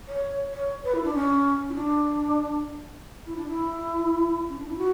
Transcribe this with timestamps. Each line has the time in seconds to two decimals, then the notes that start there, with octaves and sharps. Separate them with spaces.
0.08 C#5
0.53 C#5
0.83 B4
0.95 E4
1.04 D4
1.14 C#4
1.69 E4
1.74 D4
3.26 E4
3.36 D4
3.47 E4
4.49 C#4
4.59 D4
4.68 E4
4.77 F#4